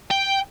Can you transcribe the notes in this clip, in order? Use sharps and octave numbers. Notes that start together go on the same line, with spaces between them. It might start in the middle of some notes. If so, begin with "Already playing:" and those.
G5